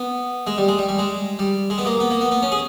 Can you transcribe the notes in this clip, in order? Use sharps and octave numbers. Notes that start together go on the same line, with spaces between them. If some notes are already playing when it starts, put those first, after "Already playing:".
Already playing: B3
G#3
G3
G#3
G3
G3
G#3
G3
G#3
B3
A#3
B3
A#3
B3
B3
C#4
G#4